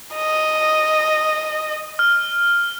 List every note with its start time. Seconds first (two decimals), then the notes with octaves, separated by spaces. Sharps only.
0.15 D#5
1.99 F6